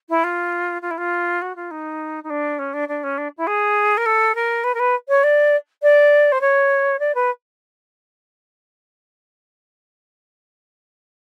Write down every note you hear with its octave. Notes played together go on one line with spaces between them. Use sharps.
E4
F4
F4
E4
F4
F#4
F4
D#4
D#4
D4
C#4
D4
D4
C#4
D4
E4
G#4
A#4
A4
A#4
B4
A#4
B4
C#5
D5
D5
C5
C#5
D5
B4